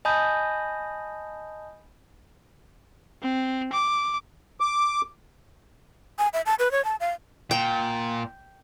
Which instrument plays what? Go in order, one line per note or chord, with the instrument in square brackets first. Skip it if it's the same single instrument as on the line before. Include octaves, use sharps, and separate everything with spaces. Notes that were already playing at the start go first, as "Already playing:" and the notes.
[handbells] D#5 G#5 A5 B5 D#6 G6
[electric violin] C4
D6
[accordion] D6
[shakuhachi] G#5
E5
A5
B4
C#5
A5
F5
[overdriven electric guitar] A#2 [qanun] G5